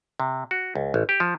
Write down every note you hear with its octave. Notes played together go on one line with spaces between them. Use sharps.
C3
F#4
C#2
A1
G4
F3